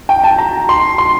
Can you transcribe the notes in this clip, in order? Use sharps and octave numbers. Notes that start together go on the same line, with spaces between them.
G5
A5
A#5
C6
C6